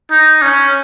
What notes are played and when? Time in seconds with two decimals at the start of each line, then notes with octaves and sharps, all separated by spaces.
0.11 D#4
0.42 C#4